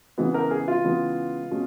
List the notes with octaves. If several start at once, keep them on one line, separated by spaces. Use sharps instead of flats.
C#3 E3 G#3 B3
A#4
G#4
F4
C#3 E3 G#3 B3
B2 G#3 C#4